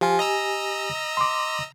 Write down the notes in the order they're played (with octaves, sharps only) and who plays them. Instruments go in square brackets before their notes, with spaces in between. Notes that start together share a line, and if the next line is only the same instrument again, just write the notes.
[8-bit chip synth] F3 F4 [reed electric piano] G4 G#5
[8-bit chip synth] D#5 A#5 E6
[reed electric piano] C6 D6